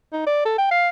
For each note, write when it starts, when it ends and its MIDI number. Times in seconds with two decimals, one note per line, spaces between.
0.13 0.22 63
0.27 0.44 74
0.45 0.54 69
0.58 0.68 79
0.71 0.89 77